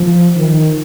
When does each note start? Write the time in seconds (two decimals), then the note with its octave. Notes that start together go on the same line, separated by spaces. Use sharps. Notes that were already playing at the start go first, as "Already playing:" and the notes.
Already playing: F3
0.37 D#3